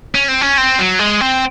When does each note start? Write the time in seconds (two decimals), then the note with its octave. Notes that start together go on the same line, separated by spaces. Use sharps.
0.15 C#4
0.28 C4
0.41 C#4
0.58 C4
0.79 F#3
0.99 G#3
1.21 C4